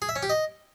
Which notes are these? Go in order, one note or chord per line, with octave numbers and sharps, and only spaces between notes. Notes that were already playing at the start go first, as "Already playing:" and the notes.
G#4
E5
C#4
G4
D#5